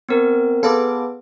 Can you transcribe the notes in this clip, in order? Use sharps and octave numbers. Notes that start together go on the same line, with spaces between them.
B3 C4 A#4
B3 G#4 A4 B4 F5 D6